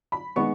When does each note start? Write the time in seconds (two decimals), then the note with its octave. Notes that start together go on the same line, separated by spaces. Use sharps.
0.12 B5
0.36 D#3 G#3 B3 C#6